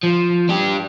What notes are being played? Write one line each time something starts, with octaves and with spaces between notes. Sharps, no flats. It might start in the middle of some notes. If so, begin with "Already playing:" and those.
F3
D4 G4